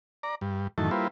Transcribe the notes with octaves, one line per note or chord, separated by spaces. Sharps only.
D5 A#5
G2
F#2 A2 D#3 E3 A5
G3 A#3 E4 F4 B4 C5